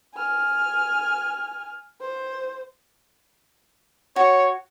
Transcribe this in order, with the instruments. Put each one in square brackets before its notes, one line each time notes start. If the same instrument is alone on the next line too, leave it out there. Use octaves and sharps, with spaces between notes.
[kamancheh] G#5 F6
C5
[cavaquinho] F#4 [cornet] C#5